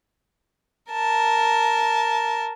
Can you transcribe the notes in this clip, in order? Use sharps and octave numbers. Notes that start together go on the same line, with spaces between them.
A#4 A5